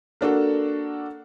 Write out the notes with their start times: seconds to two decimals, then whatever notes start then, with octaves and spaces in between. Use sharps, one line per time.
0.21 A#3 D4 F#4 A4